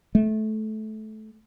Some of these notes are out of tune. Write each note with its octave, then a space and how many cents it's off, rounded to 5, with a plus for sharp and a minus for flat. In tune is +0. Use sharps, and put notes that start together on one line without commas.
A3 -20